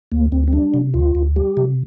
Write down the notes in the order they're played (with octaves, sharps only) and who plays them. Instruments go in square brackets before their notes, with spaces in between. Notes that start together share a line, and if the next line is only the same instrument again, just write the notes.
[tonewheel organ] D2 A#3
D2 C4
C4
G3 D4
C3
D2 F4
D2
G3 G4
C3